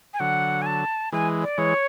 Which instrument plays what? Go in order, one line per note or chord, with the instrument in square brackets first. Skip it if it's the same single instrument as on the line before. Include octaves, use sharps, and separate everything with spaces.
[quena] G#5
[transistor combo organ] D3 F#3 [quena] F#5
[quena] G#5
A5
[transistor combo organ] E3 G#3 [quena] G#5
[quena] D5
[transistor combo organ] E3 G#3 [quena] C#5